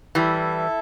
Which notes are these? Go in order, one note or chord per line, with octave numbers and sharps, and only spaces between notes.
E3 G3 E4 A4 E5